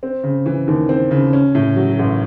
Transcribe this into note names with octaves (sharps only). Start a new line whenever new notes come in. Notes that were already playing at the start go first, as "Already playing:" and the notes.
C4
C#3
E3
D#2
C4
C#3
C#4
A2
F#3
A1